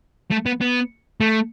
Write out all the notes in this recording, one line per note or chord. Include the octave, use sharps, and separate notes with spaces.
A3
B3
B3
A3